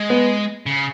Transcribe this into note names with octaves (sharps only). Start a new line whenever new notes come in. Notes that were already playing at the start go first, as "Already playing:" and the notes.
Already playing: G#3
B3
C#3